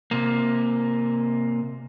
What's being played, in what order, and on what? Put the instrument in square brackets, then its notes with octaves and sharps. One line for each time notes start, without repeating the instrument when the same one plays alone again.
[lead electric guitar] C3 A#3